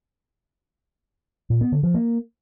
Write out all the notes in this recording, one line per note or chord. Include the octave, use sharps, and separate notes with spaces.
A#2
B3
D3
F3
A#3